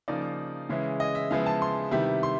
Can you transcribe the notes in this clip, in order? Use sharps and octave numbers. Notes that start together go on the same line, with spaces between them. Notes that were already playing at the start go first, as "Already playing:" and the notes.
C#3 F3 A#3 D#4 D5
C#3 E3 G#3 C#4 E4
D#5
E5
C#3 F3 G#3 B3 E4 F5
A5
C6
C3 D#3 G3 B3 E4
C6